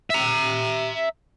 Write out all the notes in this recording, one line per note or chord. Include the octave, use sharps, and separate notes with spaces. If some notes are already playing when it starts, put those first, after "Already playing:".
E5 A#5